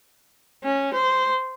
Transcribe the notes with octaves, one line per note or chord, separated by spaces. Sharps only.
C#4
C5